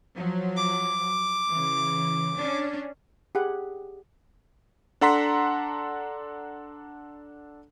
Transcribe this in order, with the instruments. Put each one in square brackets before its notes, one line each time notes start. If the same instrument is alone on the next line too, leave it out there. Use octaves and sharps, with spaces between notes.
[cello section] F3 F#3
[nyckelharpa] D6
[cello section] C#3 E3
C#4 D4
[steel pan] G4 G#4 F#5
[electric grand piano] D4 A4 F#5 A#5 C6 B6